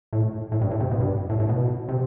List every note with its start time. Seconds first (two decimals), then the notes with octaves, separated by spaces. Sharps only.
0.13 A2
0.52 A2
0.61 G2
0.71 A2
0.80 C3
0.91 B2
1.00 G2
1.30 A2
1.40 A2
1.49 B2
1.89 C3